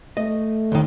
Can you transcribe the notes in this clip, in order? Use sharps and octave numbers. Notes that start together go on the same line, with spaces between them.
A3 D#5
D#2 D#3